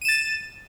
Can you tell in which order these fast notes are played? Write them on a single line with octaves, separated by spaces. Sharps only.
D#7 E7 A6